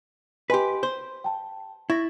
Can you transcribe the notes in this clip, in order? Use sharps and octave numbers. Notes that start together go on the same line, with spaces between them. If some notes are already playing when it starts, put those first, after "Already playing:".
G4 B4 D#5 G#5 C6
C5 C6
G5 A5
E4 C#6 A6 A#6